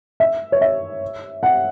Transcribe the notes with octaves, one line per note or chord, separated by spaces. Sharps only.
E5
C#5
E5
F#5